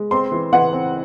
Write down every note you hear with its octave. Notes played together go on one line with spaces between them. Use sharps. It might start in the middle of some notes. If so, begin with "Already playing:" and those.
Already playing: G#3
C4 C6
E3
E3 F#5
C4